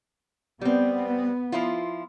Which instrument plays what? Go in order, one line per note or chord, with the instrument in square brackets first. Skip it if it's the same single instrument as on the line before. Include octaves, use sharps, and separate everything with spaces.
[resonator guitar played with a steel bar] G3 C4 [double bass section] B3
[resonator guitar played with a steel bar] F3 E4 F4